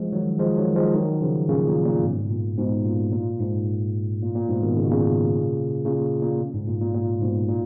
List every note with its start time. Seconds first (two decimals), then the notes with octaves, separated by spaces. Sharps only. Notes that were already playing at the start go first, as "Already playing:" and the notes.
Already playing: F3 G#3
0.12 D#3 F#3
0.39 F3 G#3
0.57 D#3 F#3
0.76 F3 G#3
0.94 D#3 F#3
1.21 C#3 F3
1.49 A#2 C#3
1.67 A#2
1.85 A#2
2.03 G#2 B2
2.30 A#2
2.58 G#2 B2
2.85 A#2
3.12 A#2
3.40 G#2
4.22 A#2
4.36 A#2
4.49 G#2 B2
4.62 B2 D#3
4.76 C#3
4.84 B2
4.91 A#2 C#3
5.85 A#2 C#3
6.22 A#2
6.54 G#2
6.67 A#2
6.81 A#2
6.95 A#2
7.21 G#2 B2
7.49 A#2